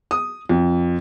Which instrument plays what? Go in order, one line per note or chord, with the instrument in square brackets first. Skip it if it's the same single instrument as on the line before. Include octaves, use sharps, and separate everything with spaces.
[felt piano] D#6
F2